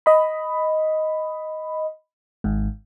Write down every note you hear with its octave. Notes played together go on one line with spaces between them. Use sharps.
D#5 B5
G#1 G#2